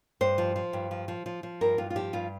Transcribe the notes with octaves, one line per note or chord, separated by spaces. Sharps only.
G2 C5
F3
F3
G2
F3
F3
F3
F3
G2 A#4
G2 F4
F4
F3 G4
G2 F4